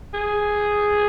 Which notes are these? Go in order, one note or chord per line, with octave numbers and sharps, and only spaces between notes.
G#4